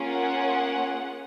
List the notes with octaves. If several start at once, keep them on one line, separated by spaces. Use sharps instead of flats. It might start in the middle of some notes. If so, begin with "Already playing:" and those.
Already playing: A#3 C#4 F4 G#4
F#5